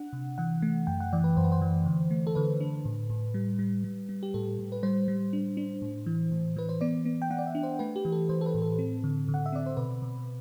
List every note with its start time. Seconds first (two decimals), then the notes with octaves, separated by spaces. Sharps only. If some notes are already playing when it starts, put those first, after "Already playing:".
Already playing: D4 F#5
0.13 C3
0.38 E3 F#5
0.62 A3
0.87 F#2 G5
1.00 F#5
1.13 E3 D5
1.24 B4
1.37 F#2 C5
1.44 B4
1.52 C5
1.62 E3
1.86 D3
2.11 A3
2.27 A4
2.35 D3 B4
2.60 D4
2.85 A2
3.10 A2
3.34 G3
3.59 G3
3.84 G3
4.09 G3
4.23 G4
4.34 A2 A4
4.58 A2
4.72 B4
4.83 G3 C5
5.08 G3
5.33 D4
5.57 D4
5.82 A2
6.06 E3
6.32 A2
6.56 E3 B4
6.69 C5
6.81 B3 D5
7.05 B3
7.22 G5
7.30 B3 F#5
7.38 D5
7.47 E5
7.55 D4
7.63 C5
7.79 A3 B4
7.96 G4
8.05 E3
8.12 A4
8.29 E3 C5
8.41 A4
8.46 B4
8.54 A2
8.62 A4
8.79 C4
9.04 D3
9.28 D3
9.34 F#5
9.46 E5
9.52 C4 D5
9.66 C5
9.77 B2 B4
10.02 B2